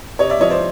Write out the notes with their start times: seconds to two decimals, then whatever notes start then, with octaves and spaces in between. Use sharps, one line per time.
0.19 C3 C#5 D#5
0.30 D5 E5
0.40 F3 C#5 D#5
0.50 C5 D5